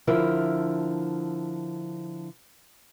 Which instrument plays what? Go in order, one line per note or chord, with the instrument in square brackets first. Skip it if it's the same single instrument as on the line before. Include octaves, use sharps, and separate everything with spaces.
[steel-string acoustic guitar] D3 F3 E4 A#4 C5